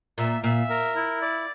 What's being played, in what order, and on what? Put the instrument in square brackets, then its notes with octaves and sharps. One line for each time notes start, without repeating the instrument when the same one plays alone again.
[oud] A#2 [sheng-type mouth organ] E5
[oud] A#2 [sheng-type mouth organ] E5
[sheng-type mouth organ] A#4
E4
D5